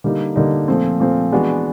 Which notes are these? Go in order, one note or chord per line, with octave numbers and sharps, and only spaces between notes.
D3 G3 A#3 D#4
D3 G3 A#3 D#4
A#2 F3 A3 C4
A#2 F3 A3 C4
E3 G#3 B3 D4 F#4